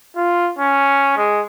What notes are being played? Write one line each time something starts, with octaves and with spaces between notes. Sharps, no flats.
F4
C#4
G#3